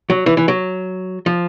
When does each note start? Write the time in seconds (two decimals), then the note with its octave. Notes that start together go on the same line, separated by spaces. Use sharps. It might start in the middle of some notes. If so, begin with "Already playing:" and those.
0.10 F#3
0.26 E3
0.37 E3
0.48 F#3
1.26 F3